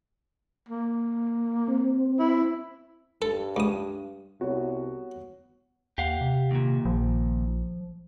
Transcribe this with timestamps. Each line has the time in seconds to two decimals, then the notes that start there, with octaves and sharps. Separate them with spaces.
0.69 A#3
1.68 C4
2.19 E4
3.22 G2 A4
3.56 C#2 D#6
4.41 C2 B3 F#4 C#5
5.98 D#2 G4 F5 F#5
6.21 C3
6.51 D#2 A#2
6.85 A#1 F3